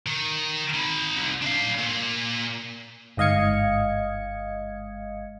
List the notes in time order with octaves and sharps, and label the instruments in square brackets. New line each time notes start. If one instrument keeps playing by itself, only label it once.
[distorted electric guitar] D#3
D#4 B5
C2
D4 F5
A#2
[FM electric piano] G1 G#2 D#5 F5 G#6 C#7